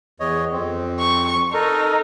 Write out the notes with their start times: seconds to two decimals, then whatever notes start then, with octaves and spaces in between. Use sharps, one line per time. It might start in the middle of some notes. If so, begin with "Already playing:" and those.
0.20 E2 C#5 D#5
0.53 F2 C4
1.00 C#6
1.54 D#4 A4 A#4